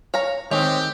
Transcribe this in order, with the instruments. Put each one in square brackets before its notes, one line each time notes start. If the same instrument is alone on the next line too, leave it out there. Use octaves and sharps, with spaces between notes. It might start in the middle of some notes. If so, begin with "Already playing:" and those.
[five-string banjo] C#5 F5 A#5
[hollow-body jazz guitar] D#3 [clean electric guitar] G#3 C4 [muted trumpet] G4 [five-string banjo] C#5